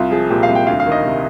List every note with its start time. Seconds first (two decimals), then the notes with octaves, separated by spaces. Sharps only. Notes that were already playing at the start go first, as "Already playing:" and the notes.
Already playing: C2 F4
0.11 F3 G#4
0.30 A#2 G4
0.43 F5
0.49 C2
0.55 G5
0.67 D2 F5
0.80 F5
0.86 D#3
0.92 D#5
1.04 C3